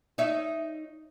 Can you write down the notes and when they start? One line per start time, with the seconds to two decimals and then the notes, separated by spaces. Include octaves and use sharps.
0.18 D#4 C#5 E5